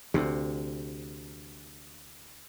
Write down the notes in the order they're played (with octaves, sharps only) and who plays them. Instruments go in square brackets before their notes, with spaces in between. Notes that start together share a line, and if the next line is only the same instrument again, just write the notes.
[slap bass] D2 C3